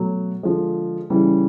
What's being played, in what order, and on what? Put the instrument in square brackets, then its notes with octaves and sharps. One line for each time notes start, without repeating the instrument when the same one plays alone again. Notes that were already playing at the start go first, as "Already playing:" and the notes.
Already playing: [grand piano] B2 F#3 A3
D3 F3 G#3
C#3 E3 G3